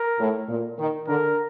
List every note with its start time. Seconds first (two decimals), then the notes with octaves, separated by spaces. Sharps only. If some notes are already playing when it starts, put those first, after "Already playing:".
Already playing: A#4
0.19 A2
0.48 A#2
0.78 D#3
1.07 D3 A#4